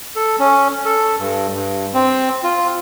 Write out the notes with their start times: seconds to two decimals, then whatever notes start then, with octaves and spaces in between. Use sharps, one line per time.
0.16 A4
0.39 C#4
0.85 A4
1.18 G2
1.54 G2
1.94 C4
2.44 F4